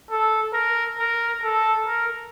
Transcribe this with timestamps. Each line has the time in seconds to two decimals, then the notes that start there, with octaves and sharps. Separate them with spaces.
0.10 A4
0.54 A#4
0.99 A#4
1.43 A4
1.87 A#4